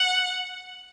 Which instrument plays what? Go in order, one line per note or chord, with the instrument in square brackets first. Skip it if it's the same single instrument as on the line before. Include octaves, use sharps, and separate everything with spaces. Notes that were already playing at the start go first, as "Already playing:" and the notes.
Already playing: [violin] F#5